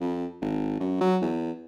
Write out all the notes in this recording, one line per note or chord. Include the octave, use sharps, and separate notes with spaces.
F2
G#1
F#2
F#3
E2